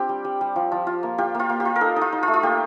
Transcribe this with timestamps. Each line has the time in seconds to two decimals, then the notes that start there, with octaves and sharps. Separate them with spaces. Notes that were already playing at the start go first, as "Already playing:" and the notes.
Already playing: C4 D4 F4 G4 D5
0.09 G3
0.25 G3
0.41 G3
0.56 F3
0.72 F3
0.87 F4
1.03 A#3
1.18 F4 G4
1.35 A#3 F4
1.49 A#3
1.60 G4
1.65 F4
1.76 A#4
1.81 D#4 A4
1.96 D#4
2.01 F4
2.12 D#4
2.23 F4
2.28 A3
2.34 F4
2.43 A#3 G4